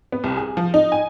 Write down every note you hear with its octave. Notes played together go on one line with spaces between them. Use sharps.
B3
C2
G#4
F3
D#4
G#5